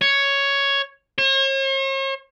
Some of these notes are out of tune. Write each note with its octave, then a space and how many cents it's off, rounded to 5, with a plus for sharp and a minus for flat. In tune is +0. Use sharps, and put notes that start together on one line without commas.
C#5 +5
C#5 -45